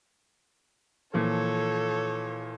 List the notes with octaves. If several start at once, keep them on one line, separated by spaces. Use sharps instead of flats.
A#2 E3 F3 A4 C#5